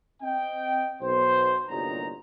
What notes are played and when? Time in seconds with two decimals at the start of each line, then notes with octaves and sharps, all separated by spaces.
0.23 C4 D#5 G5
1.01 B1 C5
1.69 G1 C2 A#2 F#3 D#4 A#5